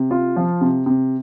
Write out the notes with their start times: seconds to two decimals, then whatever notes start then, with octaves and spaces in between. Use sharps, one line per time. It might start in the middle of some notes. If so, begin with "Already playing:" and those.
Already playing: C3
0.11 F4
0.36 F3
0.61 C3
0.86 C3